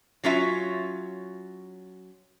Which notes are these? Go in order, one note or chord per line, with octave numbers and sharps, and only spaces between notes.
F#3 C#4 F4 E5